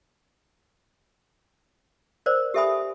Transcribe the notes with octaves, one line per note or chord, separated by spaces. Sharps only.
A#4 C5 D5
G4 A4 E5 G#5 B5 D#6